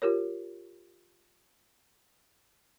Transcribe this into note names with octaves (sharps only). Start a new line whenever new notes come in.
F4 G4 A#4 C#5